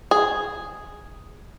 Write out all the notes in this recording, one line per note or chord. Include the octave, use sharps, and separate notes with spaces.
G#4